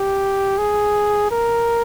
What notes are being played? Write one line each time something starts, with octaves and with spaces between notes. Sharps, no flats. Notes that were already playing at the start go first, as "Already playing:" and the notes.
Already playing: G4
G#4
A#4